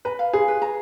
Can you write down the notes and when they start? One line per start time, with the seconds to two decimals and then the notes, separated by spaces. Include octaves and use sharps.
0.05 B4 A#5
0.19 F5
0.33 F4 G#4
0.48 B4
0.62 A#5